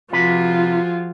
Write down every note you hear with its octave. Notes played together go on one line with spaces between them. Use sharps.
C3 F3 F4 F#4 G#4 B4